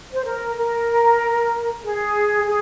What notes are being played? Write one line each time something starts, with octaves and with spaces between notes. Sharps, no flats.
C5
A#4
A#4
G#4
G#4